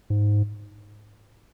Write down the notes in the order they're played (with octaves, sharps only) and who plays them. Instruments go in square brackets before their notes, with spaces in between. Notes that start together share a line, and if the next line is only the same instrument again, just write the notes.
[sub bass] G#2